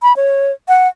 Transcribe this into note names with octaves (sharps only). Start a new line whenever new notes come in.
B5
C#5
F#5